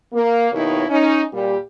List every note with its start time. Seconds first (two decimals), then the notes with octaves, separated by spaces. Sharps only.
0.13 A#3
0.53 D#2 B2 D#3 D#4 E4 C#5
0.89 C#4 D#4
1.33 A#2 G3 G4